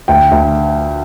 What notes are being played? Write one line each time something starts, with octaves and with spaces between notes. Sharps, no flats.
D2 G5
D2